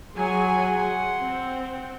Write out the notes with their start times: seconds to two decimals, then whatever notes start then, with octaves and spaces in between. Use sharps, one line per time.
0.16 F#3 G#4 F#5 G#5 C6
1.22 C4